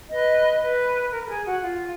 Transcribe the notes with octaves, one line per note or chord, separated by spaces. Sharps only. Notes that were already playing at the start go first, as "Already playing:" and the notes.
B4 D#5
B4
A#4
A#4
G#4
F#4
F4